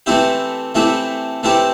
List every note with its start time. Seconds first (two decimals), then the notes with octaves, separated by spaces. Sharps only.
0.06 E3 A3 C4 E4 G4
0.75 E3 A3 C4 E4 G4
1.43 E3 A3 C4 E4 G4